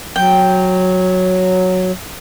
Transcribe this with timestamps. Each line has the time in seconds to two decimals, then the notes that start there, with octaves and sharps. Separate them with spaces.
0.16 F#3 G5